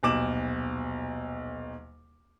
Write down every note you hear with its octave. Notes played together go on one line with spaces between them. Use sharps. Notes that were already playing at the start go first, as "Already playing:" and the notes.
D#1 B1 D6 E7 F#7